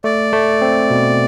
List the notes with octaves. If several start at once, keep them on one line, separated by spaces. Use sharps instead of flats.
A3 D5
A3
C4
B2